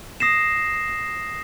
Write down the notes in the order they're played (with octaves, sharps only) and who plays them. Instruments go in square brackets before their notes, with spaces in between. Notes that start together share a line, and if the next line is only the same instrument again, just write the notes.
[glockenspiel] D#6 A#6 C7 E7